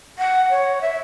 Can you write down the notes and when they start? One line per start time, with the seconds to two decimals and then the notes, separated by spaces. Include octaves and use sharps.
0.18 F#5
0.50 C#5
0.81 E5